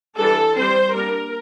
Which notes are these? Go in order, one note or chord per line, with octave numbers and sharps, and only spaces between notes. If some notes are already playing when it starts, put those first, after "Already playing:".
E3 G3 D4 A4
G3 C4 C5
G3 A#3 D4 A#4